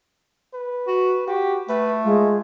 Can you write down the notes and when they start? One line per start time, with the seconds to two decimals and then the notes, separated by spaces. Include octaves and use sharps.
0.54 B4
0.87 F#4
1.27 F#4 G4
1.69 A3 B4
2.05 G#3 F4